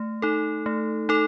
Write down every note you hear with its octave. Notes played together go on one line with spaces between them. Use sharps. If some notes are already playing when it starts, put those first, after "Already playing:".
Already playing: A3
D#4 A4
A3
D#4 A4